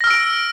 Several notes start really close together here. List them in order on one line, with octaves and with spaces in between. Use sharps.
A#6 F6 E6 D7